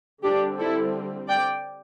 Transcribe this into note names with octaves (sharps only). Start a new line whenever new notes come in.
D3 G3 C4 D4 G4
E4 A4
D5 G5